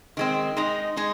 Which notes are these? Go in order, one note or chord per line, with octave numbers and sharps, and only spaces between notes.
D#3 G#3 C4
G#3 D#4 G#4
G#3 D#4 G#4